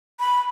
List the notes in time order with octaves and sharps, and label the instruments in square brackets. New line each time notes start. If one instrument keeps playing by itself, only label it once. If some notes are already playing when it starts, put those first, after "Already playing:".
[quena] B5